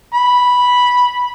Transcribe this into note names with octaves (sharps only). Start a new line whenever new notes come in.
B5